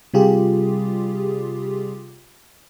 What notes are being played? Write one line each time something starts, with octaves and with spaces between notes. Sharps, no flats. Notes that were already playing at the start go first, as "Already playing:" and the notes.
C3 G3 F4 G4 G#4